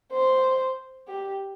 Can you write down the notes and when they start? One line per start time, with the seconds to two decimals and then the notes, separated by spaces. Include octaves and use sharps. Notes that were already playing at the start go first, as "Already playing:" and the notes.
0.12 C5
1.09 G4